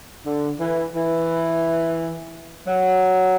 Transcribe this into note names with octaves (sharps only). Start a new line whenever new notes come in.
D3
E3
E3
F#3